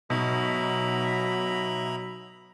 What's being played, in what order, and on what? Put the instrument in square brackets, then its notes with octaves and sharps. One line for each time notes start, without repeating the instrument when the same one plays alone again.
[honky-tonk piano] G#2 B2 [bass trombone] F#3 [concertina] E5 A#5 B5